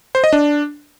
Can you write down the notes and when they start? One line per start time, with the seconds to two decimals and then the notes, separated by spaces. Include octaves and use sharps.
0.15 C5
0.24 D#5
0.33 D4